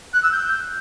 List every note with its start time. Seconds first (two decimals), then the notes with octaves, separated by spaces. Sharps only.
0.14 F#6
0.23 E6
0.32 G6